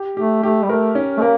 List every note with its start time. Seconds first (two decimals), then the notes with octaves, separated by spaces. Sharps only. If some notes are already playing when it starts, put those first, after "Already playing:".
Already playing: G4
0.17 A3 G4
0.43 A3 G4
0.63 G3
0.69 A3 A#4
0.95 C#4
1.18 A3
1.22 A#3 A#4